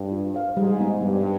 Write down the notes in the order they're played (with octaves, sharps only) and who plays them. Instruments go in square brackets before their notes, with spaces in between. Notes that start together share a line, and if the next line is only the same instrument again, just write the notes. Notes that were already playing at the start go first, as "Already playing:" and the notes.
Already playing: [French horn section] G2
[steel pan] F4
C5 F5
[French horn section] G#2 [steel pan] G3
[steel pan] B3 D#4
[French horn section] G2 [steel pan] G3